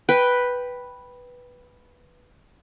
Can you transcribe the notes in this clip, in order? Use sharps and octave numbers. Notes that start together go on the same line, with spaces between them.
B4 G5